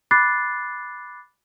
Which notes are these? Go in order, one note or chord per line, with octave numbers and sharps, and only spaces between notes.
B5 D6 F#6 A6 C7